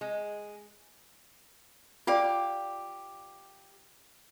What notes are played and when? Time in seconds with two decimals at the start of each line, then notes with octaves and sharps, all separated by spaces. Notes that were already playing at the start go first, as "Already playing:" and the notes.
0.01 G#3
2.07 F4 G4 D5 F5 D6